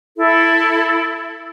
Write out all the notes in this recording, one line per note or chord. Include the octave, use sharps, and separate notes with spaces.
E4 A4